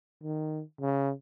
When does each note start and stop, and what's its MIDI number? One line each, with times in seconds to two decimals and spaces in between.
0.23 0.62 51
0.81 1.12 49